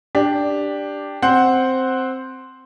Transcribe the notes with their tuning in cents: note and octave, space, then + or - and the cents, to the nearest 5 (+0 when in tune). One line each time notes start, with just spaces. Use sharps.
D4 +0 G4 +5
C4 +0 C5 +0 F#5 +0